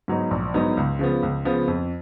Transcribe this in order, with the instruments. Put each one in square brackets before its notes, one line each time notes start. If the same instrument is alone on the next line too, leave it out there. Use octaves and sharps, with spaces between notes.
[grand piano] G#2 F#3 B3 D#4
A#1
G#2 F#3 B3 D#4
C#2
C#3 F3 B3
C#2
C#3 F3 B3
F2